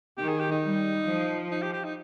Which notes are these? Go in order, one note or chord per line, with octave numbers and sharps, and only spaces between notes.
D#3 G4
G#4
G4
D#4
G3
F3
D#4
G4
G4
D#4